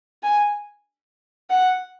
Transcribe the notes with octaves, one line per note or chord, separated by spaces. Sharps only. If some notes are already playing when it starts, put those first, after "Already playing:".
G#5
F#5